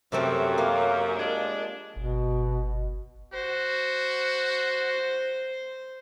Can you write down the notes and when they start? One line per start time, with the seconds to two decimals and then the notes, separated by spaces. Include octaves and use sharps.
0.12 F#2 C3 A3 C4
0.58 A#3
1.17 F3 G#3 D4
1.96 G1 B2
3.33 F#4 C5